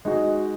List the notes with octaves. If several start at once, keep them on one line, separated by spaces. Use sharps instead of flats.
G#3 D#4 F#4